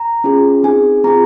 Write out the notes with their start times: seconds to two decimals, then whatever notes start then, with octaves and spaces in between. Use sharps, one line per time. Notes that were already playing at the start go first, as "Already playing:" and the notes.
Already playing: A#5
0.24 C#4 F4 G#4
0.63 C4 D#4 G#4 G#5
1.04 C4 F4 G#4 A#5